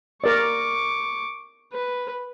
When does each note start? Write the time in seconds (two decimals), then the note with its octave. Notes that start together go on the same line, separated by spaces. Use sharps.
0.24 A#4 D5 C#6 D6
1.73 B4